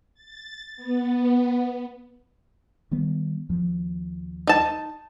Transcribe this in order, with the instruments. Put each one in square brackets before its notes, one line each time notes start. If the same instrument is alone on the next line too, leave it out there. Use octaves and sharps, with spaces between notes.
[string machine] A6
B3
[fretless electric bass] D#3 G3 B3
D#2 F3
[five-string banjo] D#4 A5